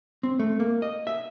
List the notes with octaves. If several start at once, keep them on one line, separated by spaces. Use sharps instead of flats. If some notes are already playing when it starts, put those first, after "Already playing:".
C4
A3
A#3
D#5
E5